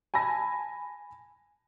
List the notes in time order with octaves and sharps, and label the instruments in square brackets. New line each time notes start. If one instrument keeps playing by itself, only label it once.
[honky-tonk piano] G#5 A5 B5 A#6